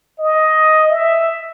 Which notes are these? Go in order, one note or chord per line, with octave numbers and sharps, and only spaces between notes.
D#5
E5